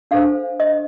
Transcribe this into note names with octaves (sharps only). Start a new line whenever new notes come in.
D4 A4 C5 F5
D#5